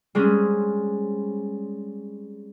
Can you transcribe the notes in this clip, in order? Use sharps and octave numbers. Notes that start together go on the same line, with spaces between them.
G3 G#3 C4 C#4 G#4